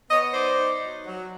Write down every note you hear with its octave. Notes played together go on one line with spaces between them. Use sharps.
B3 C#5 D#5
D#4 C5 D5
D#4
F#3
F#3